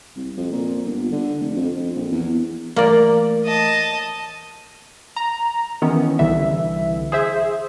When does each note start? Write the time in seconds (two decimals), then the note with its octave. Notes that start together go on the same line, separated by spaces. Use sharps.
0.16 C2
0.37 F2
0.52 A#2
0.86 G1
1.12 D3
1.40 F1
1.56 F2
1.76 F2
1.96 A#1
2.12 E2
2.76 E3 A3 A#3 D5
3.46 D#5 A5
5.16 A#5
5.82 D#3 E3 B3 C#4
6.19 C2 D3 E3 E5
7.12 G#4 C5 E5